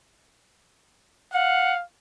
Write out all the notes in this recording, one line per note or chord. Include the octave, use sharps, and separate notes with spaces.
F5 F#5